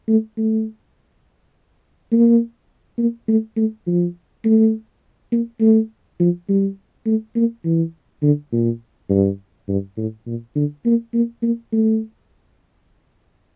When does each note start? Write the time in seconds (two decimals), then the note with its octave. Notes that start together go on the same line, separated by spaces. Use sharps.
0.08 A3
0.37 A3
2.12 A#3
2.98 A#3
3.28 A3
3.57 A3
3.87 F3
4.45 A3
5.32 A#3
5.61 A3
6.20 F3
6.49 G3
7.06 A3
7.36 A#3
7.65 E3
8.23 D3
8.52 A#2
9.10 G2
9.68 G2
9.97 A2
10.27 A#2
10.55 D3
10.86 A#3
11.14 A#3
11.43 A#3
11.73 A3